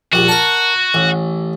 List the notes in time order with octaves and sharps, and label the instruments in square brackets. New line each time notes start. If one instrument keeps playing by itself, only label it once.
[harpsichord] A#1 G3 [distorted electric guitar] F#4
[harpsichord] A#4 A5
A1